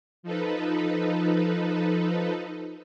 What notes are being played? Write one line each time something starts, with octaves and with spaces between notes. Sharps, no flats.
F3 D#4 A4 B4